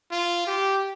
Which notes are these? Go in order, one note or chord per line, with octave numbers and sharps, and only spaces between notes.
F4
G4